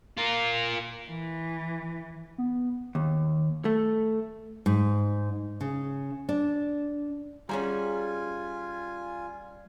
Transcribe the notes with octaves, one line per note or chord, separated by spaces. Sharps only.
F4 A#4
E3
B3
D#2
A3
G#2
C#3
D4
G3 C#4 F4 G#4 C5 G#5 A#5